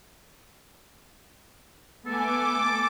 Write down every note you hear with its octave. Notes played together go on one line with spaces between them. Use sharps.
A3 B3 A4 G#5 D6